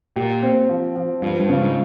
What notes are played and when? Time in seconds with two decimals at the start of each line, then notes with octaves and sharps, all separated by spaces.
0.16 A#2 G4
0.43 C4
0.69 F3
0.96 F3
1.22 G2 F3
1.40 G2
1.49 C#3
1.58 G#2